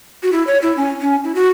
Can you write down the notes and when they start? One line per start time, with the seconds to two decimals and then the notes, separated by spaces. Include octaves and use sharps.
0.23 F#4
0.33 E4
0.47 C#5
0.62 E4
0.77 C#4
1.01 C#4
1.24 E4
1.35 F#4